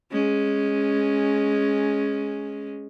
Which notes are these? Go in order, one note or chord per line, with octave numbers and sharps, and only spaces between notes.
G#3 C#4